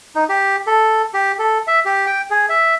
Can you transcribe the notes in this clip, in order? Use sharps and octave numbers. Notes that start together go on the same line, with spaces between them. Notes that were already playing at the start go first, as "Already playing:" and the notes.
D#4
G4
A4
G4
A4
E5
G4
G5
G#4
E5